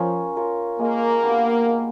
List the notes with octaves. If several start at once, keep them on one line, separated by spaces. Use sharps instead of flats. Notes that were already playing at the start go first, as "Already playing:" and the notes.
Already playing: F3 C#4 F4 A#4 C#5
F4 A#4 C#5
G#3 A#3
B3 D4 G4
G#3